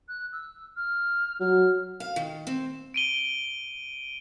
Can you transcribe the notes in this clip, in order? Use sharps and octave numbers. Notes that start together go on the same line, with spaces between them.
F#6
E6
F6
F#3 F6
F5
D#3
C4
D7 D#7 G7